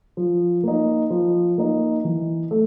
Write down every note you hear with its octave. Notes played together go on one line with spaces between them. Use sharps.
F3
A#3 D#4
F3
A#3 D#4
E3
A3